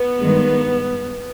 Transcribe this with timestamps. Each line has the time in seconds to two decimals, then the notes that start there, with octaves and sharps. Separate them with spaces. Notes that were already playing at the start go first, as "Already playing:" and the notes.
Already playing: B3
0.19 G2 D#3 G#3